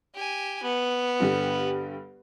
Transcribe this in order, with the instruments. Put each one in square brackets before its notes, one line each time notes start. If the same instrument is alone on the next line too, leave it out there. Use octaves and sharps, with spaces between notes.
[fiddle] G4 G#5
B3
[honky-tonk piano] G2 D3 G4